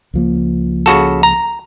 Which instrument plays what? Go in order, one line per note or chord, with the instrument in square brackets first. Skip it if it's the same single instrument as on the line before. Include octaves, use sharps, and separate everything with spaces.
[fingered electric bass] C#2 F3 A#3
[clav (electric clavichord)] C#3 F#4 A4
A#5